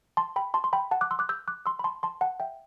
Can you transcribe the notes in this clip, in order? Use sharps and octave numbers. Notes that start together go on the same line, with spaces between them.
A5 C6
G5 B5
A5 C6
C6
G5 B5
F#5 A5
D6 F#6
C6 E6
D6 F#6
E6 G6
D6 F#6
C6 E6
B5
A5 C6
A5 C6
F#5 A5
E5 G5